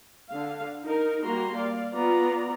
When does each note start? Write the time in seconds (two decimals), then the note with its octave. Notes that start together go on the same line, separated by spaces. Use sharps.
0.30 D3 F5
0.84 D#4 A#4
1.25 G3 A#3 F#4 A#5 C6
1.56 D5 F5
1.94 B3 F4 D5 A#5